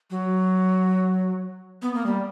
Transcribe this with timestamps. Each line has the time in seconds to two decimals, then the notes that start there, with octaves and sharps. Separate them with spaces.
0.10 F#3
1.82 B3
1.95 A#3
2.06 G3